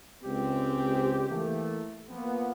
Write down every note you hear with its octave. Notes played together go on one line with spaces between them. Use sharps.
C#2 G#3 C4 G4
E3 A3 A#3
F3 A#3 B3